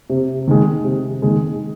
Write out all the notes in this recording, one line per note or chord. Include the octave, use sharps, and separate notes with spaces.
C3
D#3 G#3
C3
D#3 G#3